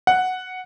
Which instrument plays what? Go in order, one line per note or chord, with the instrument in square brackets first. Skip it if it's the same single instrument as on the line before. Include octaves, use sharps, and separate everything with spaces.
[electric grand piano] F#5